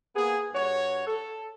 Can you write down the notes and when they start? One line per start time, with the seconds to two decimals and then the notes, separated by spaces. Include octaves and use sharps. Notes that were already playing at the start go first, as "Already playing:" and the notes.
0.15 A#3 B3 G#4
0.53 G2 F#4 C#5
1.06 A4